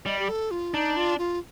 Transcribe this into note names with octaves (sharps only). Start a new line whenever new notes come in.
G3 D#5
G4
A4
F4
D4 D#4
F4
F4